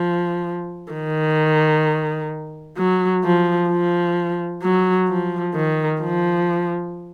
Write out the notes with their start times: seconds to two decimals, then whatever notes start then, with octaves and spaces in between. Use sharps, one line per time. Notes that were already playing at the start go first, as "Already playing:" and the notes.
Already playing: F3
0.92 D#3
2.77 F#3
3.24 F3
3.70 F3
4.63 F#3
5.09 F3
5.55 D#3
6.01 F3